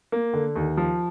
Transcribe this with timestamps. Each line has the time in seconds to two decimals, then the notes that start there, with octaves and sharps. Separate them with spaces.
0.12 A#3
0.34 D3
0.56 D#2
0.77 F3